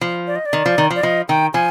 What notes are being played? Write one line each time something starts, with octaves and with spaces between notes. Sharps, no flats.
F3
D5
D#5
D5
D#3
F3
D#3
F3
D5
F3 D#5
D#3 G5
F3 G#5